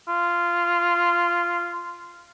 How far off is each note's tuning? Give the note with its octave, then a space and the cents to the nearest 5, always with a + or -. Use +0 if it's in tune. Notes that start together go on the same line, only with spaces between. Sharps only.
F4 -15